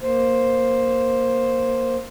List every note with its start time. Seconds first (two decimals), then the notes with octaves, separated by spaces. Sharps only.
0.01 A#3 C5